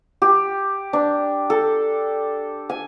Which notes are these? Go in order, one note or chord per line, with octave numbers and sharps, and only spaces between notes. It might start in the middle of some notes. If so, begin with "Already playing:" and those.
G4
D4
A4
G#5